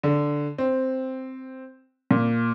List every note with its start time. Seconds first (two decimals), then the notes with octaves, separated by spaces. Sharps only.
0.03 D3
0.58 C4
2.11 A#2